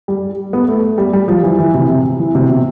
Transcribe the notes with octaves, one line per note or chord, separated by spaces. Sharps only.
G3
B3
A3
G3
G3
F3
E3
E3
C3
C3
E3
C3
B2